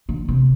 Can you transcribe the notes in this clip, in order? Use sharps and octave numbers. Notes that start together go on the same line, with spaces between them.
D3
C3